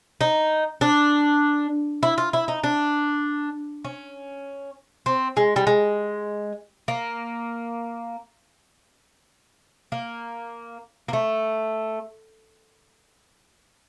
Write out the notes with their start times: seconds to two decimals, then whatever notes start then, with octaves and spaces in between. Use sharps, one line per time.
0.21 D#4
0.81 D4
2.03 E4
2.18 F4
2.33 E4
2.48 D#4
2.64 D4
3.85 C#4
5.06 C4
5.37 G#3
5.56 G3
5.67 G#3
6.88 A#3
9.92 A#3
11.08 A#3
11.13 A3